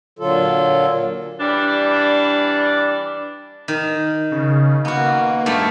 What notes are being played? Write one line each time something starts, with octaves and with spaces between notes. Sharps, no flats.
A#2 D3 F#3 F4 A4
E3 G3 D4
D#3
C#3
A#3 B3 F#4
G2 A3 F4